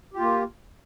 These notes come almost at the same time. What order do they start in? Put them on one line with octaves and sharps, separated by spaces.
G4 F4 A#3